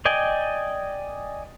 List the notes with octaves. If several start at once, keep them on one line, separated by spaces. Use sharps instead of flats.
D5 D#5 G5 G#5